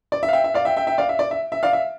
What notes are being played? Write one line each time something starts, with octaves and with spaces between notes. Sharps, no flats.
D5
E5
F5
E5 G5
E5
D5 F5
E5 G5
E5 G5
E5 G5
D5 F5
E5
D5
E5
E5
D5 F5
E5